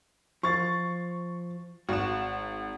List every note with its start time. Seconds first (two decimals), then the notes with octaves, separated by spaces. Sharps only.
0.43 F3 C#6 A6
1.89 G#1 F#4 E7